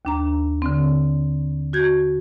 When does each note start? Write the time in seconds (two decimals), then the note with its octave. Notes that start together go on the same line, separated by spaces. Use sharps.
0.05 D#2 D4 A#5
0.62 D3 C4
1.73 F#4 G6 G#6